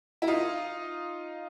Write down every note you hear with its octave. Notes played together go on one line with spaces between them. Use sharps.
E4
D#4 F4